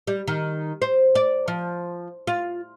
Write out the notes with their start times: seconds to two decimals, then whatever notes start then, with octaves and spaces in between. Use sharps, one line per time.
0.07 G3
0.27 D#3
0.82 C5
1.15 D5
1.48 F3
2.27 F4